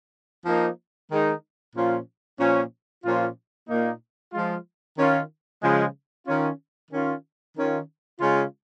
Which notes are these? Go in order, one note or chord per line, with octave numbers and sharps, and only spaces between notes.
F3 A#3 D#4
D#3 G#3 D#4
A#2 F3 C#4 F4
A#2 F3 A#3 C#4
A#2 F3 C#4 F4
A#2 A#3 D#4
F3 G#3 F4
D#3 C#4 F4
C#3 F3 G#3
D#3 C#4 F4
D#3 C#4 F4
D#3 C#4 F4
C#3 G#3 C#4 F4